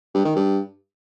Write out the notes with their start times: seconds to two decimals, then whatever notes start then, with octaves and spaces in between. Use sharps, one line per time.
0.14 G2
0.25 D#3
0.36 G2